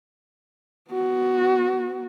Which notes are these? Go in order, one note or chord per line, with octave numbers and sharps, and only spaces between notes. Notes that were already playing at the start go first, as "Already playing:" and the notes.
B3 F#4